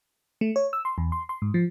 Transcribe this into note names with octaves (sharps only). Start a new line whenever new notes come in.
A3
C#5
E6
C6
E2
C6
C6
G#2
F3